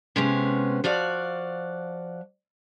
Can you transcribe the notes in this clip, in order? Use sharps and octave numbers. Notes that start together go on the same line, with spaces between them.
C3 G#3 B3 C#4
F3 F#4 D5 F5